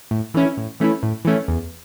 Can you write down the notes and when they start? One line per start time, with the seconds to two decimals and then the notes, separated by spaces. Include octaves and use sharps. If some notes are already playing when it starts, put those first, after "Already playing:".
0.11 A2
0.34 E3 A3 C#4 E4
0.57 A2
0.80 E3 A3 C#4 E4
1.03 A2
1.25 E3 A3 C#4 E4
1.48 E2